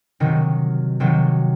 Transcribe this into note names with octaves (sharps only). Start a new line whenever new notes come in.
C3 D#3 F#3
C3 D#3 F#3